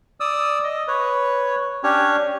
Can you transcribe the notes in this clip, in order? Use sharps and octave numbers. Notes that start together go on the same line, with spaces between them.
D5 D#6 E6
D#5
B4 C#5
C#4 D4 G4 C#5